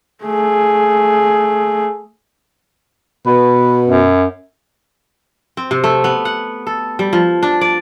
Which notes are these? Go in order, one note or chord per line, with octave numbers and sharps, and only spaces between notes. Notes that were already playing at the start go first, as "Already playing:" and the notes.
A3 G#4
B2 B4
F#2
C4
C3
A3
B3
F#5
A4
G3
F3
D4
D5